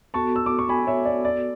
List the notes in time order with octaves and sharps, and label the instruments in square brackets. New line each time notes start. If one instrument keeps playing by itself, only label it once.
[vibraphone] B3 F#4 A4 [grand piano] A5 C#6
[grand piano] E6
D6
C#6
G#5 B5
C#5 E5
D5
D5